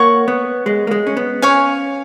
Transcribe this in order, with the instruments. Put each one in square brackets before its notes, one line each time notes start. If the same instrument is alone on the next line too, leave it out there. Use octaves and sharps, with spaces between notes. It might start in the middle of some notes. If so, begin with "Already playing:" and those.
Already playing: [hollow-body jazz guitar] A#3 [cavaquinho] C#5 F#5 C#6
[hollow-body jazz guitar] B3
G#3
A#3
G#3
C#4
B3
[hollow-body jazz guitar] C#4 [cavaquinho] C#5 F5 G#5